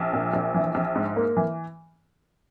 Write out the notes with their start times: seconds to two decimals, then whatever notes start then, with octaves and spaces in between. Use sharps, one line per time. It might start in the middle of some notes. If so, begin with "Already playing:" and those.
Already playing: A#1
0.13 A#2
0.34 A#1
0.54 E3
0.75 A#1
0.95 G#2
1.16 A#3
1.37 E3